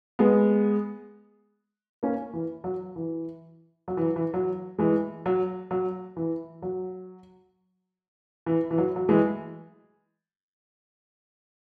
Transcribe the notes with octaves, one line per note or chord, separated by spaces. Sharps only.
G#3 B3
A#3 C#4
E3
F#3
E3
F#3
E3
E3
F#3
E3 G#3
F#3
F#3
E3
F#3
E3
E3
F#3
F#3
E3 G#3